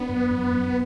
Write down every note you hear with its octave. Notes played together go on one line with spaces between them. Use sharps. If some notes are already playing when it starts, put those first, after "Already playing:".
Already playing: B3 D4
F#2
F#2
F#2